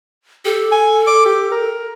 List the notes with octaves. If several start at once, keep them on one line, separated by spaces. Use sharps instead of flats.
G4 A4
G#5
D6
G4
A#4